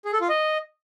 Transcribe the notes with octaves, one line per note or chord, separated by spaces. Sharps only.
G#4
A4
F4
D#5